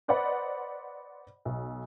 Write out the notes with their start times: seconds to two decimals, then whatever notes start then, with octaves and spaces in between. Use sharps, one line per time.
0.08 B4 C5 D5 D#5 F#5 B5
1.45 B1